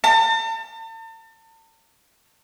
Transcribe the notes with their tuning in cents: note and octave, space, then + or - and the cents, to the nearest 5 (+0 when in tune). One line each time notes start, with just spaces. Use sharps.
A5 +40